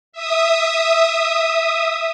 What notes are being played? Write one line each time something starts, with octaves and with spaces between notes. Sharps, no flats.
E5 D#6